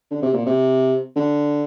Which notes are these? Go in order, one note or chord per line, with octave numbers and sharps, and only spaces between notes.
D3
C3
A#2
C3
D3